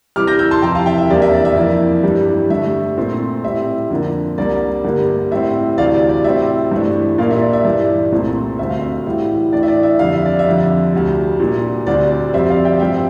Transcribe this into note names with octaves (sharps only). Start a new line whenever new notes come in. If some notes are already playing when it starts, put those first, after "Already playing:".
C3 E3 G3 D6 F6
G6 A#6
E6 G6
A5 C6
F2 C3 E3 G5 A#5
F5 A5
E5 G5
E5
E2 C3 G3 A#3 D4 D5
E5
D5
E5
F2 E3 A#3 D5
G2 E3 G3 D4
G2 D3 A3 E5
A#2 A3 C4
A2 G3 C4 E5
F2 D3 F3 A#3 D4
C2 C3 G3 A#3 D4 D5
G2 D3 G3 A#3 D4
A2 G3 C4 E5
D2 C3 E3 G3 D5 F5
D5
D5
A2 G3 C4 E5
G2 E3 A3 D4
A#2 G3 A#3 D4 D5 F5
E5
D5
E5
G2 E3 G3 D5
C2 A#2 A3 C4
D2 D3 A3 C4 E5
F5
E5
A2 E3 G3
A2 E3 A3 D4 D5
E5
D5
E5
F2 D3 G3 F5
E5
D5
E5
F2 D3 G3
D2 C3 G3
A#2 G3 D4
D2 D3 G3 C4 D5
D5
F2 C3 G3 C4 E5
D5 F5
E5 G5
G2 F3 C4 E5 G5